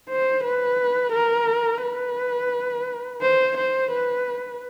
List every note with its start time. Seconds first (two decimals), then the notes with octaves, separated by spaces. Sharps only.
0.09 C5
0.44 B4
1.13 A#4
1.83 B4
3.22 C5
3.57 C5
3.92 B4